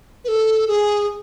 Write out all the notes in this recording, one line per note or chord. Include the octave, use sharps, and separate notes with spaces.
B4
A4
G#4